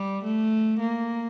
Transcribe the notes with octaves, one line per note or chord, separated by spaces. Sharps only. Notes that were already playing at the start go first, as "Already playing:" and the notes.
Already playing: G3
A3
A#3